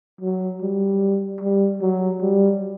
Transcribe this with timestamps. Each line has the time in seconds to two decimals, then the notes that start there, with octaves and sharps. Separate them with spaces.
0.21 F#3
0.61 G3
1.41 G3
1.82 F#3
2.21 G3